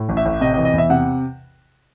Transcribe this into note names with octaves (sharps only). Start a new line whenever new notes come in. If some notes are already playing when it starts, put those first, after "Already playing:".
Already playing: A2
A1
E5
A1
C3 D#5
D#5
E3
D#5
E2 E5
C3 F#5